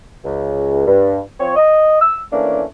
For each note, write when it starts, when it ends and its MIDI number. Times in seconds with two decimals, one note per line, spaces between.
0.25 0.85 37
0.87 1.19 43
1.40 1.54 53
1.40 1.54 60
1.40 1.54 73
1.56 2.00 75
2.02 2.20 88
2.33 2.64 52
2.33 2.64 57
2.33 2.64 58
2.33 2.64 61
2.33 2.64 62